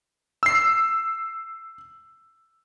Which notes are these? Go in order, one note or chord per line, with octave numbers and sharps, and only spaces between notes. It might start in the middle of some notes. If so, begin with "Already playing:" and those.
E6 C7